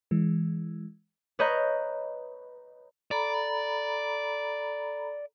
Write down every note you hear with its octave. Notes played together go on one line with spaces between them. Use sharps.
E3 G#3
B4 C#5 D#5 A#5 G6
A4 D5 A#5 B5